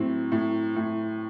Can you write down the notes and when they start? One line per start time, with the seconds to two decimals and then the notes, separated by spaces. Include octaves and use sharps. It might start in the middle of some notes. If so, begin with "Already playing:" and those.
Already playing: A2 F#3 C4
0.32 A2
0.76 A2